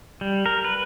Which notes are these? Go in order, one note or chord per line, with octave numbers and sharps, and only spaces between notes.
G3
A#4
B4